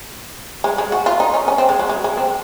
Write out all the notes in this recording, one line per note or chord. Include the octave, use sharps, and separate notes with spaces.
G#3
G#3
F#4
F4
D#4
C#4
C#4
C4
G#3
F#3
G#3
G#3
C4